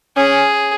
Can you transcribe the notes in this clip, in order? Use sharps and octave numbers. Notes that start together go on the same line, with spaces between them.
C#4 G#4